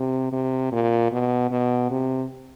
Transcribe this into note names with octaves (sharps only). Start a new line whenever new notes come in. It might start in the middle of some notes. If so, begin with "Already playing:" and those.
Already playing: C3
C3
A#2
B2
B2
C3